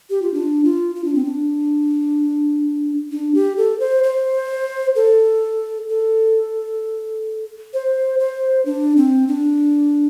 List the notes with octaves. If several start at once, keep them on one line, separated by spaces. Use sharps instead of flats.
G4
F4
D4
F4
F4
D4
C4
D4
D4
G4
A4
C5
C5
A4
A4
C5
C5
D4
C4
D4